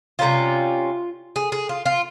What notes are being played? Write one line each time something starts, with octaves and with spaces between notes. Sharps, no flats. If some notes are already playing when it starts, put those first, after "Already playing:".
C3 D#3 G3 C#4 F4
G#4
G#4
F4
F4